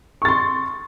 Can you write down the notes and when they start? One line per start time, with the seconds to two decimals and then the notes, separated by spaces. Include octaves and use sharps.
0.22 C#6
0.25 A6
0.28 C6